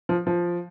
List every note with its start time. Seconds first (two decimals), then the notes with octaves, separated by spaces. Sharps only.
0.09 F3
0.27 F3